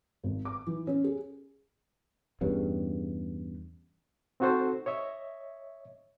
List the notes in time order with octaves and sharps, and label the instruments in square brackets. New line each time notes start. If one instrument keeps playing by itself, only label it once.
[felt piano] G#1
D6
E3
C#4
G#4
[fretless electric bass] E2 G2 C#3
[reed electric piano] C4 D#4 F#4 A4 C5
C#5 D#5 E5